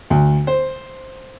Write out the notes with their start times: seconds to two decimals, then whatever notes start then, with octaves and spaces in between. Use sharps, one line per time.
0.10 D2
0.47 C5